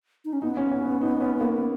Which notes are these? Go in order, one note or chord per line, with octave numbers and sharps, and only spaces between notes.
D#4
C#4
B3 D#4
C#4
C#4
C#4
D#4
C#4
A#3